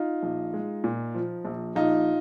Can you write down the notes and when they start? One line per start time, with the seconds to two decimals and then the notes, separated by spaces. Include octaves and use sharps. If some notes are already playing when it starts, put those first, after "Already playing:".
Already playing: D#4 F4
0.23 A#1
0.54 G#3
0.84 A#2
1.15 F3
1.45 A#1
1.76 A#1 D#4 F4